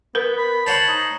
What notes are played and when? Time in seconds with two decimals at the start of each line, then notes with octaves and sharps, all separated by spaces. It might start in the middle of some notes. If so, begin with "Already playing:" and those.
0.15 B3 A#4 B4
0.37 B5
0.67 C5 C#5 F#5 A5
0.88 D#4